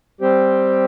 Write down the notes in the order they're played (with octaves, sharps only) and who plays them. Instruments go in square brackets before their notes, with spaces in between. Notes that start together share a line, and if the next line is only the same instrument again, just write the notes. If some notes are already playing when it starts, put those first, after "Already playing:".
[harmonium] G3 C4 G4 C5